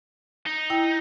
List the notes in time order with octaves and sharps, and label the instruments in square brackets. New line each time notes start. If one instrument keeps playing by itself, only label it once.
[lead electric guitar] D#4
[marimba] E4 G5